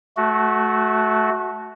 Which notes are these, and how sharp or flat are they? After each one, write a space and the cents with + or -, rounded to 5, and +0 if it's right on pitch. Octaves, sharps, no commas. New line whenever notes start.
A3 -20 F#4 +0